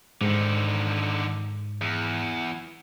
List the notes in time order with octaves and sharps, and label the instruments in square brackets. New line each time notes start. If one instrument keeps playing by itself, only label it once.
[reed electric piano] G#2 [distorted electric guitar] D3 D#3
[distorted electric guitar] E2